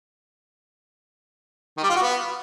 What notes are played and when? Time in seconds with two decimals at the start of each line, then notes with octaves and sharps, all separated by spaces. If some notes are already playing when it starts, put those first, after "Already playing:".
1.77 D#3
1.83 G3
1.89 F4
1.96 F#4
2.02 B3